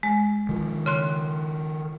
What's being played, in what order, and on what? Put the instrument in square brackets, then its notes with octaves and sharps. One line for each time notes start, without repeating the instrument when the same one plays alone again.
[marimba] G#3
[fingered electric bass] D#3 F3
[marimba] C#3 C6 F#6